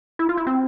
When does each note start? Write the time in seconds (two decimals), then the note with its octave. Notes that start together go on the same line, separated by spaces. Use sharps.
0.19 E4
0.29 F4
0.37 E4
0.47 C4